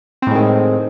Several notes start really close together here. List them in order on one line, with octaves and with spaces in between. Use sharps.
C4 A2 G#3 D#3